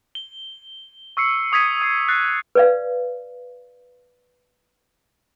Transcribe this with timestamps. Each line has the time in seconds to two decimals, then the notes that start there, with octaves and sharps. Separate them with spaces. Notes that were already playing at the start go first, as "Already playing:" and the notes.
0.15 G7
1.17 C#6 E6 C7 C#7
1.52 C#6 D#6 G#6 B6 D#7
1.82 D#6 C7
2.08 F#6 A6 C7
2.55 B4 D5 F5